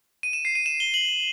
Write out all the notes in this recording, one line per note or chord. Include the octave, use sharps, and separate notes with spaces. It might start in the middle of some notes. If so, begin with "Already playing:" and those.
D#7
E7
C7
D#7
E7
G7
F#7